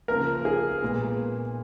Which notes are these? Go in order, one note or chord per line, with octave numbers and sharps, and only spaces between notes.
C#3 F3 A#3 A#4
G#4
A#2 G#3 B3